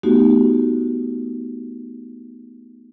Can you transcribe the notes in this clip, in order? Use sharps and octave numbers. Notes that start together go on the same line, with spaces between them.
A3 B3 D#4 F#4 G4